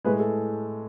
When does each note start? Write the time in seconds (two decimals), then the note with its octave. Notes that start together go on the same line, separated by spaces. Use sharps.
0.04 A2 G#3 B4
0.20 A4